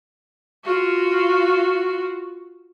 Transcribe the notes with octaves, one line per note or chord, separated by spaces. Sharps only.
F4 F#4